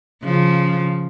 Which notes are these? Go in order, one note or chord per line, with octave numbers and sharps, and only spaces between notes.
C#3 F3